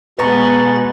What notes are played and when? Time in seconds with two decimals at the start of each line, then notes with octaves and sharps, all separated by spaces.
0.19 B2 G#3 B3 B4 G#5 A#5 C#6 A6